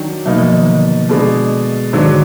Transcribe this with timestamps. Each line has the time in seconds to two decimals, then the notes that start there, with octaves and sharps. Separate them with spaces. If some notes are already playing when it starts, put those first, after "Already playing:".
Already playing: D#3 F#3 D4
0.26 B2 F#3 A#3 D#4
0.38 F3
0.52 D#3
0.65 D3 F3
1.09 B2 G#3 D4
1.93 G#2 D#3 F#3 D4
2.05 D3